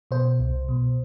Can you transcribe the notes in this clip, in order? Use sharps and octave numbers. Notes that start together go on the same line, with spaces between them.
B2 C5
C2
B2